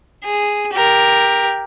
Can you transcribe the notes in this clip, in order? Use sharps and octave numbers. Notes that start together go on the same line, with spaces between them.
G#4
G4 A#4